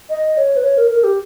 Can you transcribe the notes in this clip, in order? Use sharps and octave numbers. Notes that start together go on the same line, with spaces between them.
D#5
C#5
B4
C#5
A#4
A#4
G4